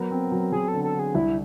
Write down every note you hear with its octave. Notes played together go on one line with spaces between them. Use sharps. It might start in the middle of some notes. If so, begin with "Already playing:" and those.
Already playing: F#3 B3 A#4
C4
F#3
F#3 G#4
A4
D3
A4
D3 G#4
C2 E4